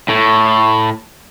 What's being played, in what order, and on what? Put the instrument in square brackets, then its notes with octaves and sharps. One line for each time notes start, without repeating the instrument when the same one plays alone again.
[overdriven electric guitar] A2